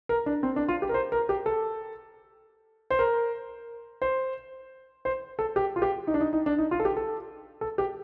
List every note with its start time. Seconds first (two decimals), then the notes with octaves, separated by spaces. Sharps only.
0.09 A#4
0.26 D4
0.43 C4
0.56 D4
0.68 F4
0.82 G4
0.89 A#4
0.94 C5
1.12 A#4
1.29 G4
1.46 A4
2.90 C5
2.99 A#4
4.02 C5
5.05 C5
5.39 A4
5.56 G4
5.76 F4
5.82 G4
6.07 D#4
6.14 D4
6.20 D#4
6.33 D#4
6.46 D4
6.58 D#4
6.71 F4
6.80 A4
6.85 G4
6.97 A4
7.61 A4
7.78 G4